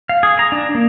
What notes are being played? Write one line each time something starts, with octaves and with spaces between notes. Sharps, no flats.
F5
G#4
A#5
D4
A#3